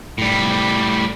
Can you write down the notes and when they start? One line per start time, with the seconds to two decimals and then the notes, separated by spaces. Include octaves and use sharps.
0.18 A2 G3